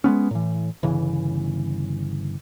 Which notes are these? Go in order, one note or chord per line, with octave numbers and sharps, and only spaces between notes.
G#3 A#3 B3 C#4
A2 E3
G1 C#3 E3